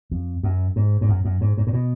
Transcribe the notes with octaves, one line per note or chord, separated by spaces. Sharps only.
F2
F#2
G#2
G#2
F#2
F#2
G#2
G#2
A2
B2